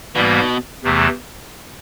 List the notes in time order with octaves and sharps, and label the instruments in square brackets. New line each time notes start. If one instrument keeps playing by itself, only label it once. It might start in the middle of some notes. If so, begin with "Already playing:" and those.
[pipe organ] G#2 E3 G3 A#3 [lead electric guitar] B2
[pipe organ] E2 C3 E3 A3